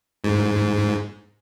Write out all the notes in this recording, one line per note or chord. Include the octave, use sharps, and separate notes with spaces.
G#2